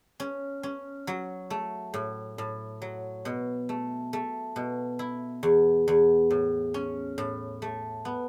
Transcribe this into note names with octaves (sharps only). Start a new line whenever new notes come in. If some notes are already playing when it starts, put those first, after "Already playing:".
C#4
C#4
F#3
A3
A2
A2
F#3
B2
A3
A3
B2
E4
E2
E2
A2
C#4
A2
A3
B3